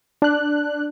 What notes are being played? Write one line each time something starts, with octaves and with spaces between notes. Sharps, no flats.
D4 F#6